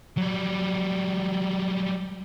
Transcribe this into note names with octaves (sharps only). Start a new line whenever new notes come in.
F#3 G3